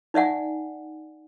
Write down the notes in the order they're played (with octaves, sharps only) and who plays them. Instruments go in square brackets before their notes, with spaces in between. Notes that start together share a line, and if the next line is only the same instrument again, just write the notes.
[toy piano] D#4 D5 E5 F#5 G#5